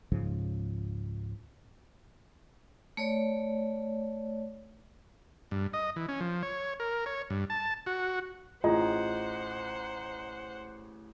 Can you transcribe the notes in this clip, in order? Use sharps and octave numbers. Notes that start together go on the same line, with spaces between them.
C#2 G#2 C#3 F3
A3 C#5 D5
G2
D#5
E3
C#4
F3
C#5
A#4
C#5
G2
A5
F#4
A1 F4 G#4 C5 D#5 F#5 A#5